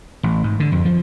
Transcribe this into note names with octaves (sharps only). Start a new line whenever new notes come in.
A1
G#2
D3
F2
F3